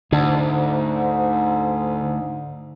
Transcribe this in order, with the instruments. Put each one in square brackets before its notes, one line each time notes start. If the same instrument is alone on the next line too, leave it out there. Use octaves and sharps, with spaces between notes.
[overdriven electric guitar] D2 [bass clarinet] G#2 [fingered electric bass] D3